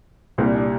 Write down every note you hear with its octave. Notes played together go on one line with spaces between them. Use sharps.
C2 A#2 G3 C4
D4